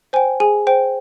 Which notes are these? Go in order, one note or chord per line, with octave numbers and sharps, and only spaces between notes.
C5 G5 G#5
G#4 G#5
C5 G5